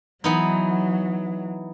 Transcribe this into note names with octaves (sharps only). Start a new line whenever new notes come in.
E3 F#3 B3 D#4